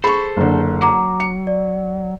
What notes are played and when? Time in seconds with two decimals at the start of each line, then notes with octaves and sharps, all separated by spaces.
0.04 G#4 A4 C5 B5 C#6
0.37 F#1 D3
0.82 F#3 A#5 D6
1.20 C#7
1.47 D5